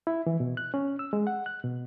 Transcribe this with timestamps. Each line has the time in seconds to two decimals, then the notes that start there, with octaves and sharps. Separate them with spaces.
0.07 E4
0.27 E3
0.40 B2
0.57 F#6
0.74 C#4
0.99 E6
1.13 G#3
1.27 F#5
1.46 F#6
1.64 B2